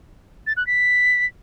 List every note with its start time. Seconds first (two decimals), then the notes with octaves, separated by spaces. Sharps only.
0.47 A6
0.57 F#6
0.67 B6